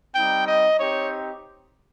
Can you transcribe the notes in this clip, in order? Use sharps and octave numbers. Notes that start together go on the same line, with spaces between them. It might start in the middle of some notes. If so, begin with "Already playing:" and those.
G3 C4 D#4 G5
D#5
C4 D#4 G4 C#5